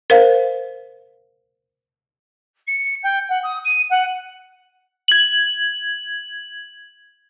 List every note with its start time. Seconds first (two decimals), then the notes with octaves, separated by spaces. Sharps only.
0.10 A#4 C5 F5
2.67 C#7
3.03 G5
3.29 F#5
3.43 D#6
3.65 D#7
3.90 F#5
5.08 G#6 F#7